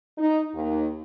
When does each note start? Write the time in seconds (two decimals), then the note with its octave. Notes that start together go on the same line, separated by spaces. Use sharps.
0.18 D#4
0.54 D#2